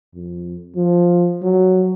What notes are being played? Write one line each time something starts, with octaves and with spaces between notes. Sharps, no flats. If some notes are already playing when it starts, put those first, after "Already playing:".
F2
F3
F#3